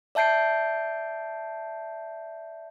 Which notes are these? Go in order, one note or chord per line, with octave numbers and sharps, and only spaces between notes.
D5 E5 A5 G6 C7 D7